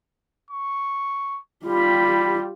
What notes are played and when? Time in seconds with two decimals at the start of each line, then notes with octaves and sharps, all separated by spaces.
0.50 C#6
1.66 G3 F4 G4 B5